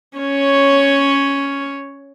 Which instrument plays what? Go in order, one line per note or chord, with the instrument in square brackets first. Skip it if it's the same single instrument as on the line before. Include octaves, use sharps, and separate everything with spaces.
[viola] C#4 C#5